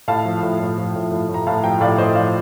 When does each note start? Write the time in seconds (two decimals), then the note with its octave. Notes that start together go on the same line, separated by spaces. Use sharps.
0.08 A2 F5 A5
0.25 F3
0.43 A2
0.60 A2
0.78 F3
0.95 A2
1.12 A2
1.29 A2
1.34 A#5
1.47 A2 F5 A5
1.63 F3 G5 A#5
1.80 A2 D5 F5
1.98 A2 C5 D#5
2.15 F3 D5 F5